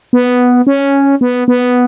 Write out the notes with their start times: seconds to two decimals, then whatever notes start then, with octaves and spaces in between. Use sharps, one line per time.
0.13 B3
0.67 C#4
1.21 B3
1.48 B3